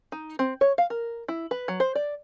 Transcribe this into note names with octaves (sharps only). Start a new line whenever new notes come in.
D#4
C4
C#5
F5
A#4
E4
B4
F#3
C5
D5